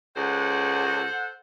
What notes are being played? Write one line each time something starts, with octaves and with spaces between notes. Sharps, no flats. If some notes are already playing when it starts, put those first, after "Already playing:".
C#2 A4 C5 F#5